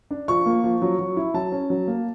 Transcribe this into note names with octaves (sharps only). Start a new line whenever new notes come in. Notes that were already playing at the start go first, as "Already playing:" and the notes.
D4
F3 C#6
A#3
F3
F#3
F#3
E4
F#3 A5
C#4
F#3
A#3